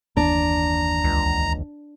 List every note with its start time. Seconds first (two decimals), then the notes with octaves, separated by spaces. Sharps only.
0.17 F#1 D#2 E3 D4 A#5
1.04 C#2